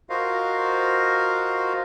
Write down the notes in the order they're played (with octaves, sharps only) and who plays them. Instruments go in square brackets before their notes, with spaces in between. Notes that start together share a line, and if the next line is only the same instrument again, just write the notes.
[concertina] F4 F#4 A#4 C5 D#5 F5